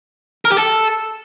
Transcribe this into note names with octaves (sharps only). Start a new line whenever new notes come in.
A#4
G4
A4